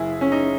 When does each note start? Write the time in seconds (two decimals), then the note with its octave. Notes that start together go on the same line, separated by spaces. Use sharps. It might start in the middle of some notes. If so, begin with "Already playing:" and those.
Already playing: F#1 E4 G#4
0.21 C#4
0.32 D#4